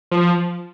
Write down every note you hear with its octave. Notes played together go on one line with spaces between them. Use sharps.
F3